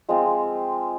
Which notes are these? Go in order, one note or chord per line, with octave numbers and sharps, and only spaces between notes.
F3 G#3 C4 F4